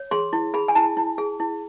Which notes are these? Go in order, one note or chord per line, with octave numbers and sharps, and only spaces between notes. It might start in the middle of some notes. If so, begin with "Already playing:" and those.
Already playing: C#5
G#4 C6
E4
G#4 B5
G#5
E4 A5
E4
G#4
E4